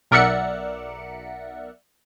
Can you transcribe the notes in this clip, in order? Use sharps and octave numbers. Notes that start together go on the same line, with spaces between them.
B1 A#4 D5 E5 F#5 C#7